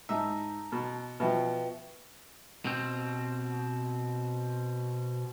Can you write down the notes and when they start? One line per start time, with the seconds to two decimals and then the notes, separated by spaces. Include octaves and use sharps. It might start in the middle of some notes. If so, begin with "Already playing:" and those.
0.09 G#2 D#4 E5 A5 A#5
0.72 B2
1.20 B2 F3 B4 E5 G5
2.65 B2 C4